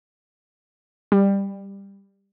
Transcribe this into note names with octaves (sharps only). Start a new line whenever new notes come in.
G3